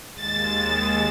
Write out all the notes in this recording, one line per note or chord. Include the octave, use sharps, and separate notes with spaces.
D#2 G#3 A6 E7